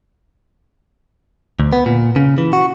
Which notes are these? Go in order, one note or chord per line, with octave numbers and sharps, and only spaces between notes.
D2
B3
A#2
C#3
E3
F#4